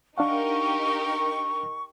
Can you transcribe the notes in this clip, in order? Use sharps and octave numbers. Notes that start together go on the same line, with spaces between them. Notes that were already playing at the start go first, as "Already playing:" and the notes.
D4 D#4 G4 A#4 F5 F#5 C#6